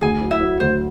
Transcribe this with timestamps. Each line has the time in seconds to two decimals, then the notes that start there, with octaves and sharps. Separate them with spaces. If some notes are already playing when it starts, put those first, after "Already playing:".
0.01 D2 G#4 G#5
0.21 F#3
0.31 E4 E5
0.41 F#3
0.60 D2 C5